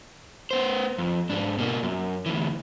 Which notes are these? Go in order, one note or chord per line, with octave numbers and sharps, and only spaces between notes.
B3 C5
F2
G#2 D4
B2 A#3
F#2
D2 E3